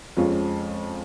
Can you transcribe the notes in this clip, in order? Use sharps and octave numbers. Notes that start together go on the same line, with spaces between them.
F2 F3 G#3 C#4 F4